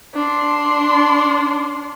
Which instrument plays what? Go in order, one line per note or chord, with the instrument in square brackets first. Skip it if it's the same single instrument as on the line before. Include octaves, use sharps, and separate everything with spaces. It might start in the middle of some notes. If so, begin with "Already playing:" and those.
[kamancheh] D4 C6